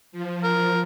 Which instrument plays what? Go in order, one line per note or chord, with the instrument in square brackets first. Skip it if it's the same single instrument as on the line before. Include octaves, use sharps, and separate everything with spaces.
[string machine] F3
[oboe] A#4